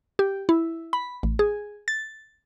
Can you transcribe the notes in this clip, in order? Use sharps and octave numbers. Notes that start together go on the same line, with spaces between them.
G4
E4
B5
A1
G#4
A6